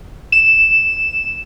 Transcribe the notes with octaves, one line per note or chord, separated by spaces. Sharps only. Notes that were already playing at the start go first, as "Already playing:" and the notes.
E7